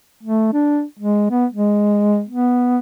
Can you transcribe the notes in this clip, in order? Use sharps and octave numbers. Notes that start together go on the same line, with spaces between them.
A3
D4
G#3
B3
G#3
B3